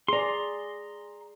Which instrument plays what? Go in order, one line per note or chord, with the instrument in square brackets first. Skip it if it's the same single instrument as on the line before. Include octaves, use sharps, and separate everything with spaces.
[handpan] G#4 D5 [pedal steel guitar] A#5 C6